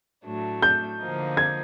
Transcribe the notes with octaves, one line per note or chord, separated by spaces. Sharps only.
A2 F#3 A3 D4
G6
D3 F3 A#3 D#4
G#6